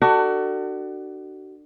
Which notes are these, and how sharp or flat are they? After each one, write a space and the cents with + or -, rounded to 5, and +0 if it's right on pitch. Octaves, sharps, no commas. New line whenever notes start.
D4 +30 F#4 +30 A4 +30